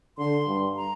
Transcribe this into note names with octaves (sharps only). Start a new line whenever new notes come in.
D3 C6
G2
A#5